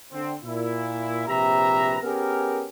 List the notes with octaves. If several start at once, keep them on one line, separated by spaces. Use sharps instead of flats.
D3 C4
A#2 E4
A#1 C3 G4 B4 E5 A#5
B3 C#4 G4 G#4 A#4